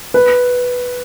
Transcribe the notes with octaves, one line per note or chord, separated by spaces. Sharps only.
B4